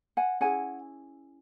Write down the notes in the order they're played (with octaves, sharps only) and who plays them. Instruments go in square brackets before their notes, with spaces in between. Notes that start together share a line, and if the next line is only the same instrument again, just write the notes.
[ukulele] F#5 G#5
C#4 E4 G#4 F#5 G#5